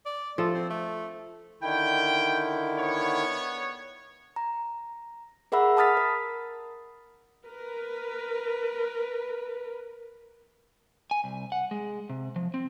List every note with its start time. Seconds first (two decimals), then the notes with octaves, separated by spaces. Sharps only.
0.06 D5
0.38 F3 A3 A4
0.55 C4
0.70 A3
1.62 D3 D#3 E4 G5
2.77 B3 C#5
4.36 A#5
5.52 G#4 A#4 E5 F#5 B5 E6
5.77 A5 B5 D#6 F6 A6 B6
5.97 A#4
7.46 A#4 B4
11.11 G#5
11.24 C2
11.52 F#5
11.71 G#3
12.10 C3
12.36 F3
12.54 C4